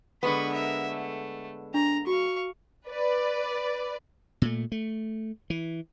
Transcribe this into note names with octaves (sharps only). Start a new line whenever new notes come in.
D3 G#3 B3 B5 C#6
A#4 E5
A3
D4 A#5
F#4 F5 C#6
B4 D5
A#2 A3
A3
E3